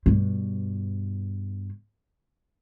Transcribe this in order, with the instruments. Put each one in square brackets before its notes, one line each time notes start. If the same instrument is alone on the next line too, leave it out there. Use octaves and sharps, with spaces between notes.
[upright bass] G2 B2